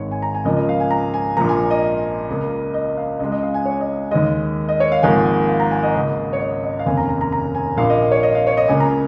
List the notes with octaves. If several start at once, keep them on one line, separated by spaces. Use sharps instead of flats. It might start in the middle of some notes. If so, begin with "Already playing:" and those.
Already playing: G#1 G#2 G#3 C#5
G#5
A#5
G#5
C#2 C#3 F3 A#3 D#5
D#5
F5
G#5
A#5
G#5
A#1 A#2 F3 A#3 A#5
G#5
D#5
C#2 C#3 A#3
D#5
F5
C#2 C#3 G#3 D#5
D#5
F5
G#5
C#5
D#5
D#2 D#3 G#3 D#5
D#5
C#5
F5
G#1 G#2 F3 A#3 G#5
G#5
F5
A#5
G#5
D#5
C#2 C#3 A#3
C#5
D#5
D#5
F5
F1 D#2 C#3 A#3 G#5
A#5
A#5
A#5
A#5
G#5
A#1 A#2 A#3 F5
D#5
C#5
D#5
F5
C#5
D#5
C#2 C#3 A#3 G#5
A#5